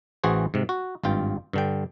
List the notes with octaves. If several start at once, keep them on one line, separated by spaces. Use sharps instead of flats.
A1 E3 F#4 G#4 C5
G#2 C3
F#4
G#1 G2 F4 G5
G2 D3 G5